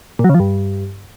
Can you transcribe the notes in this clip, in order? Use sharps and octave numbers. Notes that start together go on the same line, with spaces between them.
A#2
F#3
C#3
F3
G2